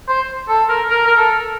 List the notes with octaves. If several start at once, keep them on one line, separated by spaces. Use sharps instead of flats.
C5
A4
A#4
A#4
A#4
A4